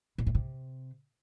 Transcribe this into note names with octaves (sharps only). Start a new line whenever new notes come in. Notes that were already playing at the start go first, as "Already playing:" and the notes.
B2
A2
C3